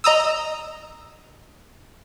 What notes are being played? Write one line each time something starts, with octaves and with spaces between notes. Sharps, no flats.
D#5 A#5 D#6 E6